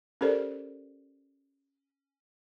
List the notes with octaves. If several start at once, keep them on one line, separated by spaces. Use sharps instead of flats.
C#4 G4 A4 A#4 C5 D5